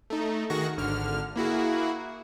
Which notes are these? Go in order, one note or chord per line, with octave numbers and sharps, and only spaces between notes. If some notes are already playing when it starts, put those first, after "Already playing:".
A3 D#4
D#3 F#4 G#4 C#6 A#6
G#1 D3 F6
A#3 E4 F#4 G#4